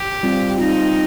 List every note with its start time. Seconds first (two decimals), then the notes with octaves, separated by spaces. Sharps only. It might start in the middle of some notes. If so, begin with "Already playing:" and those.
Already playing: G4
0.23 G3 C4 F4
0.58 G3 C4 D#4 F4